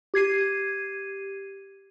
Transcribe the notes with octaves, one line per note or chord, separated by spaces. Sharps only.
G4 G#6 C7 D#7